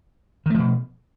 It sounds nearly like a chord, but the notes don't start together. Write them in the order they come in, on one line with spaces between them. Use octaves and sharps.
D#3 A3 F3 B2